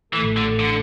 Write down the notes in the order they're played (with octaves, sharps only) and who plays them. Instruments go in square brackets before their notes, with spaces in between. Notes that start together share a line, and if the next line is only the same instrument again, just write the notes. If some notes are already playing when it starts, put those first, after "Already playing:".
[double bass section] A1 A2 A3 [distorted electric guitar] E3
[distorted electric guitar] D3
D3